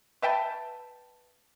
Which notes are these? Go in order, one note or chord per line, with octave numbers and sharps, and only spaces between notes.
B4 E5 G5 A5